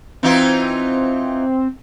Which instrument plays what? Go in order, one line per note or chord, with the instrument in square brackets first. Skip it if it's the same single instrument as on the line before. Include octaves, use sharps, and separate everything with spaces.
[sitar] E3 D#4 F4 [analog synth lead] C4